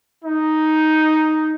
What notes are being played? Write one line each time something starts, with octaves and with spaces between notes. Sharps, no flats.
D#4